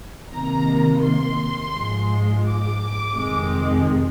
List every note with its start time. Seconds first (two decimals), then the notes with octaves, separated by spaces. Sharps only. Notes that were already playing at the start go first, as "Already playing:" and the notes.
0.33 C3 D#3 A#3 A#5
1.03 C6
1.75 G#2 F3 G#3
2.46 D6
3.15 F2 C3 D#3 G#3 C4